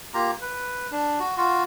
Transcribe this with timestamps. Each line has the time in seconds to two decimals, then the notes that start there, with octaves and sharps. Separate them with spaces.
0.14 A#3 F4 G4 A#5
0.41 B4
0.91 D4
1.20 F#4
1.37 F4 F#4